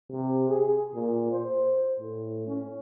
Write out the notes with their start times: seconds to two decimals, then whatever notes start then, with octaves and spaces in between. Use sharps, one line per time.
0.10 C3
0.48 G#4
0.95 A#2
1.32 C5
2.00 A2
2.47 C#4